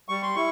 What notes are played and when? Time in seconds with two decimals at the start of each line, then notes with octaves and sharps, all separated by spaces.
0.09 G3 C#6
0.22 C6
0.36 E4 C#6